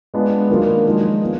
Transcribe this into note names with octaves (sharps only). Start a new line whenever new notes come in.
G#3 B3 D4 F4
D#3 F#3 A#3 D4 F4
F3 G#3 D#4
G#3 B3 F4